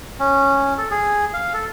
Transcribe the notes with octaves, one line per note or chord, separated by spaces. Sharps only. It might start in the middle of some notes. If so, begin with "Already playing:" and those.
C#4
A4
G#4
F5
A4